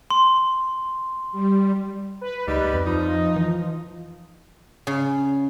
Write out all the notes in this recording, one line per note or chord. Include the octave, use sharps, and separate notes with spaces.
C6
G3
B4
D2 G#2 G3 D#4
F2
F3 D#4
E3
C#3